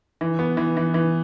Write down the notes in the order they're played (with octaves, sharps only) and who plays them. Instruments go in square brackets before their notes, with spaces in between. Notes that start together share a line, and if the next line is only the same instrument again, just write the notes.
[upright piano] E3
B3
E3
E3
E3